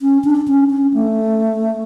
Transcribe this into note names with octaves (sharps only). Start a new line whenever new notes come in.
C#4
D4
C#4
C#4
A3